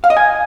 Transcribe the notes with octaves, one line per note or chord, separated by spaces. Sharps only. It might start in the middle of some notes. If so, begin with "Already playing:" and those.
F5
D#5
G#5